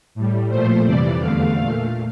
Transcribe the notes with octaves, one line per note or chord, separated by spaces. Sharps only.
A2 G3
A#2 F3 A3 C5
F2 C3 E3 G3 D5
E2 D3 A3 F5
A#2 A3